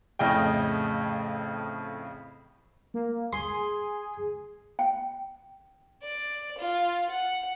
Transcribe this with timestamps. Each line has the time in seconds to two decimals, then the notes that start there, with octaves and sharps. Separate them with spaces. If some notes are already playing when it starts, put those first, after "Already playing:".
0.19 F2 A2 C#3 D#5 G5
2.94 A#3
3.33 G#4 C6
4.79 G5
6.03 D5
6.58 F4
7.10 F#5